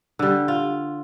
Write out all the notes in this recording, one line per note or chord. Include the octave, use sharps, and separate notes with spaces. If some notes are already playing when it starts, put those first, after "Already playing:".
D3 G3
F4